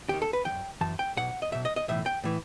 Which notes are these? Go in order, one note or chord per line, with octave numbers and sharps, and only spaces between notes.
D#2 D#3 G4
A4
B4
F#2 E3 G5
F#2 E3 A5
G5
B1 B2 F#5
D#5
B1 B2 E5
D#5
D#5
B1 A2 E3 E5
G5
A2 E3